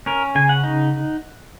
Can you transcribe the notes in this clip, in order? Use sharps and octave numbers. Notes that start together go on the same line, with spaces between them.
C#4 A#4
C#3 G#5
F#5
D#4